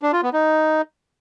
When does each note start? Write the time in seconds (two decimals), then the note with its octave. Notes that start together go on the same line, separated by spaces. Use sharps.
0.02 D4
0.13 F4
0.23 B3
0.33 D#4